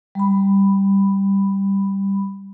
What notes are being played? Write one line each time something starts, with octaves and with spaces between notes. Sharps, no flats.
G3 B5